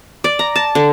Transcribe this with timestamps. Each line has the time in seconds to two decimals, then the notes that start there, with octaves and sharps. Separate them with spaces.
0.24 D5
0.39 A#5
0.56 A5
0.75 D3